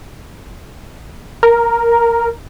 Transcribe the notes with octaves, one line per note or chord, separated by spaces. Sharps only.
A#4